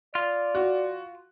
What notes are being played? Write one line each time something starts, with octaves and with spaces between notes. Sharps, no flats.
F4 D5
F#4